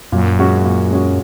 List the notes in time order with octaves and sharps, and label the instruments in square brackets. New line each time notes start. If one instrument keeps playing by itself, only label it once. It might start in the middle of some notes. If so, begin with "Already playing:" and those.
[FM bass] F#2 [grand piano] A#2
[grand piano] G#3 C#4 F#4
A#2
G#3 C#4 F#4